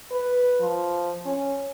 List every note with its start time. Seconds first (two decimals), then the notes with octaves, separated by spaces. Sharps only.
0.11 B4
0.61 F3
1.25 C#4